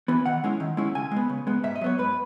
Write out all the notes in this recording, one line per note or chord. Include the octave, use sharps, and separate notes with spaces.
E3 B3 E4
D#3 F#5
G#3 C#4 E4
D#3
G#3 C#4 E4
C#3 G#5
G#3 B3
C#3
G#3 B3
G#2 E5
D#5
F#3 B3 C#5
G#2 B4